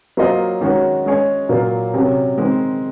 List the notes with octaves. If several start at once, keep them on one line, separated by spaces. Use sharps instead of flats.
F#3 A#3 F4 C5 D#5
D#3 G#3 C#4 F#4
G#3 C#4 G#4 C#5
A#2 F#3 A#3 F4
C3 F#3 C#4
D#3 G#3 C4